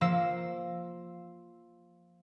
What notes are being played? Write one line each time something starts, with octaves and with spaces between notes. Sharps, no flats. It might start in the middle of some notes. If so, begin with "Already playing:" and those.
F3 A#3 E6 A#6 C7 E7